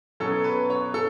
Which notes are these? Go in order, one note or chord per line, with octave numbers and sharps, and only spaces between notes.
B2 F#3 C#4 A4
B4
C#5
C#4 A4